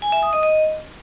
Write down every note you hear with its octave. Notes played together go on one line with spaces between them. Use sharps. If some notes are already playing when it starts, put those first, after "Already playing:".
G#5
E5
D#6
D#5
D#5